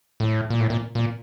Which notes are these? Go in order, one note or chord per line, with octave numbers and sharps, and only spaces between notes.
A2
A#2
A2
A#2
A#2